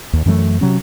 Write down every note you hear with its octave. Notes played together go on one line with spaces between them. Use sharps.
D#2
F#2 E3 F#3 A3
C3 F#3 C#4